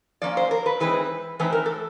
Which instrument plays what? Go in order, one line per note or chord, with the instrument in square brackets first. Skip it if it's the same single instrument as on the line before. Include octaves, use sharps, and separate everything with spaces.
[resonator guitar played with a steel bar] F3 A#3 C#4 D5
C5
A#4
B4
E3 G#3 C4 D#4 B4
E3 A3 C4 D#4 B4
A#4
A4